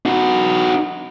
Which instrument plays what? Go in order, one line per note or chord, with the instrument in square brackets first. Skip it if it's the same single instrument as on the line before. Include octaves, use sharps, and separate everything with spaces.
[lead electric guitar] D#4 F#4